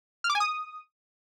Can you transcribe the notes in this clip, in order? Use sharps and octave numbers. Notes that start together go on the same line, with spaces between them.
F6
D6
G#5
D#6